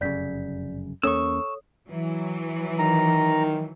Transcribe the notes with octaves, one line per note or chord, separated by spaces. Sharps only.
F1 F#2 C#3 D5 G6 B6
E2 A#3 C#4 A4 C#5 C#6 D#6 E6
E3 F#3
D#3 A#5